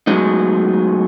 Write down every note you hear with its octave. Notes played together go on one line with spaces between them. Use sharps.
F#3 G#3 A3 B3 D#4